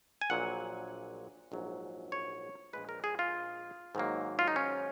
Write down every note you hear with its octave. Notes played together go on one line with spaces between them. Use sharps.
G#5
A#1 A#2 F#3 F#5
A#1 G#2 F#3
C#5
A#1 A#2 G#3 B4
A#4
G#4
F4
G#2 D#3 F#3 A#3
F4
D#4
C#4